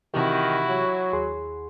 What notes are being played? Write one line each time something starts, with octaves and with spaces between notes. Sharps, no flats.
C3 D#3 E3 E4 F#4 G4
F#3
D#2 G#4 C6